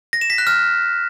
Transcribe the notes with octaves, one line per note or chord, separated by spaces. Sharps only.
A#6
E7
B6
F#6
F6